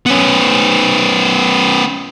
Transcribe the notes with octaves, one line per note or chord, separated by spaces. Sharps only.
B3 C#4